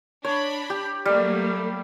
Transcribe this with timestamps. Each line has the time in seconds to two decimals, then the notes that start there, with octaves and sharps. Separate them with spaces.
0.25 D4 C#5 B5
0.70 G4
1.06 F#3 G3 A3 A#3